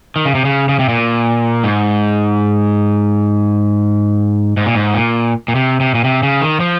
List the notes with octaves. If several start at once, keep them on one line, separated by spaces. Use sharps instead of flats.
D#3
C#3
C3
C#3
C#3
C3
A#2
G#2
G#2
A#2
G#2
A#2
A#2
C3
C3
A#2
C3
C#3
D#3
F3